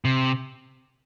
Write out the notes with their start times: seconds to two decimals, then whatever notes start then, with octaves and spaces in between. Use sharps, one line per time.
0.05 C3